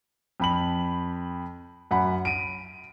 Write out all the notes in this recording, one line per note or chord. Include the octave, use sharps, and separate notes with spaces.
F2 B5 F#7
F#2 F#5 B5
D7 D#7